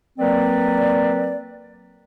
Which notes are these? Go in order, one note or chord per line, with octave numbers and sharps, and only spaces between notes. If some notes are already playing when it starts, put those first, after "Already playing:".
F#3 A#3 C4 A#4 B4 D5